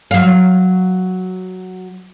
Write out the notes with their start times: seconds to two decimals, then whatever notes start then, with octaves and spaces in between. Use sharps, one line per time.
0.11 F#3 F5